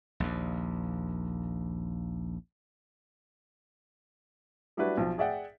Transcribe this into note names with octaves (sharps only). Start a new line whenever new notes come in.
A#1 D#2
F#3 G3 D4 E4 F#4 B4
B1 F3
G#4 D5 E5 F#5 G5